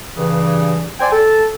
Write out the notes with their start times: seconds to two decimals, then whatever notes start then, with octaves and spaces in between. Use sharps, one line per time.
0.17 G2 C#3 E3
0.99 C5 D5 G5 G#5
1.11 A4